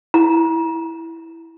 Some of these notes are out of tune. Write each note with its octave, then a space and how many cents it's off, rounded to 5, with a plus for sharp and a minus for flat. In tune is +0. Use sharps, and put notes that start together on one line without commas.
E4 +0 A#5 +40